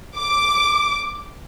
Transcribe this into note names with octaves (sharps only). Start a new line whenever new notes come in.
D6